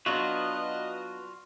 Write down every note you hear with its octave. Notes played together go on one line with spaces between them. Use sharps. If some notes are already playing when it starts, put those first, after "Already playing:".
F#3 B3 D4 F4 F#4 B4 D#5